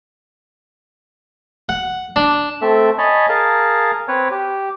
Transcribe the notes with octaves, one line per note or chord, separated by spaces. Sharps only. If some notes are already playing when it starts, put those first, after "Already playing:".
F#5
D4
A3 C4 A4 E5
C#5 D#5 G#5 A5 B5
G#4 A#4 F5 A5
C4 B4 C#5
G4